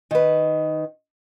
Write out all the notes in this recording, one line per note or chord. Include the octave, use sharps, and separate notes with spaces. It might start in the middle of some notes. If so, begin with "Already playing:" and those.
D#3 B4